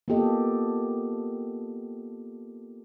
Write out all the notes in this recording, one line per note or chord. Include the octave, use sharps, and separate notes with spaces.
A#3 B3 F4 G4 A4 D#5